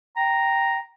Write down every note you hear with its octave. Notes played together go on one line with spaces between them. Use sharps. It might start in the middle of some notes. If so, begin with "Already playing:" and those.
G5 A#5